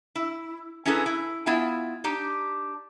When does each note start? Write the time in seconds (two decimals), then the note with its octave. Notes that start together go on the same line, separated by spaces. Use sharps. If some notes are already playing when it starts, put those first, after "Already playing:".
0.15 E4
0.86 C#4 D#4 E4 G#4 A4 B4
1.06 E4
1.46 B3 E4 F4 E5 G#5
2.04 D4 D#4 G4